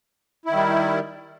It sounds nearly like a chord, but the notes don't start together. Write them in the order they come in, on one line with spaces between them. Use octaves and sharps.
E4 D#3 G3